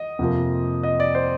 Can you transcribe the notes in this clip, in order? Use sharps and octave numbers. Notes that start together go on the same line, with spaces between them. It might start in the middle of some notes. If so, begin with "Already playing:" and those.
Already playing: D#5
F2 C3 F3 A#3
D#5
D5
C5